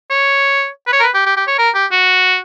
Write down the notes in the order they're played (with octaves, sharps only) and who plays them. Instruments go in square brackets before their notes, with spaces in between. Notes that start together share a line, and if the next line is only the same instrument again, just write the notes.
[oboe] C#5
B4
C#5
A#4
B4
G4
G4
G4
C#5
A#4
G4
F#4